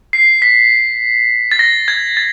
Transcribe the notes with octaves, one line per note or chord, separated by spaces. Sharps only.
C7
B6
A6
A#6
G#6
A6